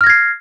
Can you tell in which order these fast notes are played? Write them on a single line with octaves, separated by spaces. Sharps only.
F6 A#6 G#6 C7